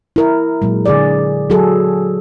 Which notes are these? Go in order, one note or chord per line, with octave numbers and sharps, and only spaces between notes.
E4 A#4
A#2 F#3 G#3
D3 G#4 D5
F#3 F#4 G#4 A4